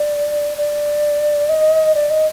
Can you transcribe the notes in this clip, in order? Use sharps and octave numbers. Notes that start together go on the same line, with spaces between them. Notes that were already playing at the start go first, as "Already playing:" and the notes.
Already playing: D5
D5
D#5
D5
D#5